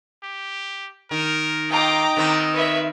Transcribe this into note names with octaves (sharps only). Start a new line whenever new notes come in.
G4
D#3 A#4
F4 D#5 G5 A#5 D6
D#3 B3 C4
B4 C#5 E5